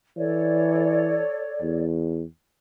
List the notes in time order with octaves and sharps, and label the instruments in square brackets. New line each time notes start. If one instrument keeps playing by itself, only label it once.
[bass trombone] E3 [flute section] A4 C#5 D5
[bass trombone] E2